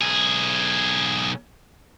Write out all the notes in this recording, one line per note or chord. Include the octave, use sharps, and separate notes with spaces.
B1 G#4